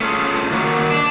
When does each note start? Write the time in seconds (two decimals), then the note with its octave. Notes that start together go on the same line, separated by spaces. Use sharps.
0.01 A3 C#4 F4 G#4
0.51 D#3 F#3 A#3 F#4
0.91 D4